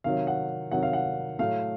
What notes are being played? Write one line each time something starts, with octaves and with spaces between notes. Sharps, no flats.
C3 D#3 F#3 F5
F#5
C3 D#3 F#3 F#5
F5
F#5
A2 F#3 A3 F5